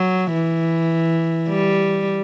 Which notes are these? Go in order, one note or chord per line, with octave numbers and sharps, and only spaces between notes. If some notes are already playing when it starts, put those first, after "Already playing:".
Already playing: F#3
E3
G3